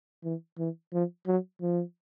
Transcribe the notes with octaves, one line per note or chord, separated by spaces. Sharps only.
E3
E3
F3
F#3
F3